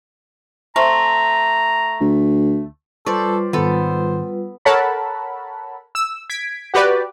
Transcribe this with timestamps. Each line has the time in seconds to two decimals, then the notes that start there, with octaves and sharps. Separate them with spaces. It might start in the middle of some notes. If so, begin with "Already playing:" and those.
0.76 A3 C4 A#5
2.01 D2
3.06 G3 F4 A4 B4 C5 D5 C#6
3.53 G#2 D#3 B3 A4 C5
4.65 A4 A#4 C#5 F#5 A5 B5
5.95 E6
6.30 G#6 B6 D7
6.74 F#4 G4 B4 D5